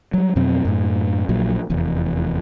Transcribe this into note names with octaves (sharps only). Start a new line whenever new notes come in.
F#3 G3
F2 B2 F#3 C4
F#2 A2
A#1 A#2 F#3
F1 E2